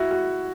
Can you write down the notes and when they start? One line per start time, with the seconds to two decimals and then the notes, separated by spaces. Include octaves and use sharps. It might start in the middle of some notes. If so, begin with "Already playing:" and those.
Already playing: E4 F#4
0.11 F#4